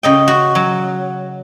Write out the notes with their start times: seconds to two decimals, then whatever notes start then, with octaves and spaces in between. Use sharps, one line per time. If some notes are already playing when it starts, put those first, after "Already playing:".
0.03 C#3 D#5 G5
0.28 F#4
0.55 F#3